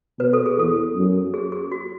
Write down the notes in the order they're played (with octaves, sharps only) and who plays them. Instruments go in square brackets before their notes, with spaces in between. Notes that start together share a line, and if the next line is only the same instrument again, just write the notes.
[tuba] B2 [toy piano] B4
[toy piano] A4
G#4
[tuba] E2 [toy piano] A4
[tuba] F#2
[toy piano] G#4
G#4
F#4